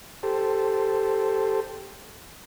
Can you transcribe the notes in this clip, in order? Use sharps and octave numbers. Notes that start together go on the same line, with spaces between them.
G4 A4 C5